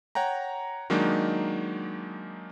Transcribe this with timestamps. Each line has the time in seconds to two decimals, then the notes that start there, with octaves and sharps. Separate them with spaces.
0.15 C#5 F#5 G5 A#5
0.90 D#3 F#3 G#3 A#3 D4 D#4